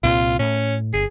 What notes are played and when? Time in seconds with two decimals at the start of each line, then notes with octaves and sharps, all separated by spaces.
0.03 C2 A#2 C4 F4
0.39 A2 C#4
0.93 G1 G#4